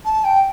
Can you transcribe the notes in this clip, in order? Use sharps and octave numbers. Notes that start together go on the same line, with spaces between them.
A5
G5